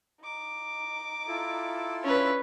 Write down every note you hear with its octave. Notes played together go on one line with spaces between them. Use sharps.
D#4 D6
E4 F4 A4
C#4 D4 B4 G#5